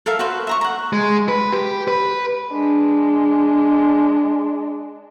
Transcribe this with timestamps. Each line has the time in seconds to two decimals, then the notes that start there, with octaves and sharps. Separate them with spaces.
0.06 A4 A#4 E5 F5
0.19 F#4 B4 C5
0.47 E5 A#5 C#6
0.61 F#5 A#5
0.93 G#3
1.29 B4
1.53 G4
1.88 B4
2.52 G#3 D4